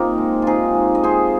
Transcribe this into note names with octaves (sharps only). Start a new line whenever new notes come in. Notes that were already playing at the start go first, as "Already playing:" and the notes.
Already playing: C3 A#3 C4 D#4 F4
G#3
C3 D#4 F4 G#4
G#3
D#5
C3 G#4 C5